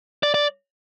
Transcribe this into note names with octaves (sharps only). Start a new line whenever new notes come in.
D5
D5